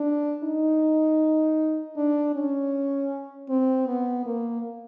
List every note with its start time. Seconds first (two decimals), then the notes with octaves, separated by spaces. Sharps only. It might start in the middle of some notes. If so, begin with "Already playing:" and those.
Already playing: D4
0.44 D#4
1.97 D4
2.35 C#4
3.49 C4
3.87 B3
4.26 A#3